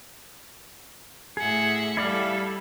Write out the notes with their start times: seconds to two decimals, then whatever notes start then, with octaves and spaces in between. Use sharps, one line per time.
1.37 A2 G#4 E5 F#5
1.97 G3 E4 A4 D5 F5